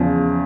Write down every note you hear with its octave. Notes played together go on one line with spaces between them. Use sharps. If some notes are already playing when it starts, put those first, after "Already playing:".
Already playing: E2 C#3 F3